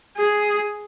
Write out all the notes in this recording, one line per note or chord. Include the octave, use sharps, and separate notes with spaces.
G#4